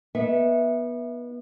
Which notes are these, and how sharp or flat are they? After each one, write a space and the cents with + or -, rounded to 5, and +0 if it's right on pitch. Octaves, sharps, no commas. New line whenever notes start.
B3 -25 D#4 +15 E5 +0